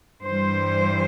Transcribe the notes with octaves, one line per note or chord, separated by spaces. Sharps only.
G2 E3 G3 C5